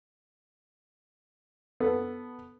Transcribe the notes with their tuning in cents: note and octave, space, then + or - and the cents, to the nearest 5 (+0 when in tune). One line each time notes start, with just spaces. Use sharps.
B3 +0 A4 +0